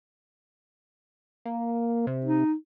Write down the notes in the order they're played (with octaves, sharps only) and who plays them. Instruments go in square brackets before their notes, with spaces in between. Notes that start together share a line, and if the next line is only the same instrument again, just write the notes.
[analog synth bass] A#3
C3
[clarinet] D#4